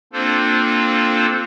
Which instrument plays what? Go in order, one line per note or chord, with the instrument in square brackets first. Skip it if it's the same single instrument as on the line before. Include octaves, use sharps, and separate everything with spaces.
[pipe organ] A#3 C4 D4 F4 A4 C5